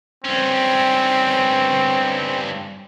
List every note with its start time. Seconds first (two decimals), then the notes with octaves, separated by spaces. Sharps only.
0.25 G2 C4 C#4